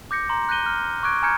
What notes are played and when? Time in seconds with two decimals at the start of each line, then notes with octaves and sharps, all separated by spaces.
0.11 D6 G6 A#6 C#7
0.29 A#5 C6
0.49 F#6 G6 A#6 D#7 G7
0.66 F6
1.03 C#6 D6 F#6 G#6 D7
1.23 G#5 A#5 F6 G6 G#6 C#7